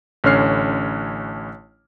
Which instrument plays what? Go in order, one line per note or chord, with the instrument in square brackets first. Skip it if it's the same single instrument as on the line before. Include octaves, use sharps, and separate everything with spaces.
[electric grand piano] A1 D3 C#4 C#5 F6 C7